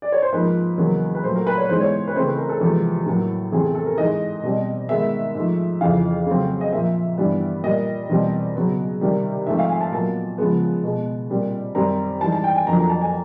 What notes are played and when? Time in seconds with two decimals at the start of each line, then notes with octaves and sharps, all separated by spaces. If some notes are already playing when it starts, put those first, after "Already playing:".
0.02 D5
0.12 C#5
0.22 C5
0.32 G#2 F3 A#3 B4
0.78 E2 C#3 F#3 A#3
1.15 B4
1.24 A#2 F#3 A3 C5
1.36 A#4
1.47 B4
1.58 C#5
1.69 G#2 E3 G#3 B3 C5
1.80 C#5
2.07 B4
2.15 C#3 E3 A3 C4 C5
2.27 B4
2.38 A#4
2.49 A4
2.61 E2 C3 F3 G#3
3.06 A2 F#3 A#3
3.52 E2 C3 E3 A3 C4 G#4
3.63 A4
3.75 A4
3.86 A#4
3.98 G#2 E3 G#3 D#5
4.43 B2 G3 C4
4.89 G#2 D#3 G#3 B3 E5
5.35 G#2 F3 A3
5.81 F2 C#3 E3 F5
6.27 C#3 F#3 A3 C4
6.61 D#5
6.73 A#2 F3 A#3 E5
7.18 G2 E3 G3 B3
7.64 A#2 G3 A#3 D#5
8.09 E2 B2 G3 C4
8.56 C#3 F#3 B3
9.01 C3 D#3 G3
9.47 G#2 F3 A3 C4 E5
9.59 F5
9.69 G#5
9.81 A5
9.92 A#2 F#3 B3 A5
10.38 C#3 F3 G#3 B3
10.84 B2 G#3 B3
11.30 A#2 G3 C4
11.75 F#2 D#3 G3 C4 A#5
12.21 G#2 E3 G3 A5
12.32 A5
12.44 G5
12.55 G#5
12.66 F2 D3 F#3 A#3 A#5
12.78 A#5
12.90 A5
13.02 G#5